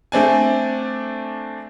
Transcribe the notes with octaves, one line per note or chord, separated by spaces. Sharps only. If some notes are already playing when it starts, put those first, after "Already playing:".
A3 C4 D4 G#5